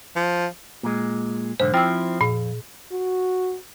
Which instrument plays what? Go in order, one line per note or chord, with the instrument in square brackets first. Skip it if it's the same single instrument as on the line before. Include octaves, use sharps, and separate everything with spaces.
[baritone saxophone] F3
[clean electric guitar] A#2 G#3
[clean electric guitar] B1 G#2 D3 [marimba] C5
[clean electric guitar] F3 C4 E4 [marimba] G5 E6
[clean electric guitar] F2 [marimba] A#2
[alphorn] F#4